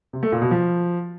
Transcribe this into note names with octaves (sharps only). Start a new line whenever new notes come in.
C3
A3
A#2
B2
F3